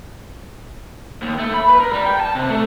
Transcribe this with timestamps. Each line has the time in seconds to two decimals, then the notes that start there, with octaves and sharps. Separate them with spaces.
1.22 D#2
1.39 A3
1.54 B5
1.69 B4
1.80 A#4
1.93 G3
2.06 G5
2.20 A5
2.35 C3
2.50 A3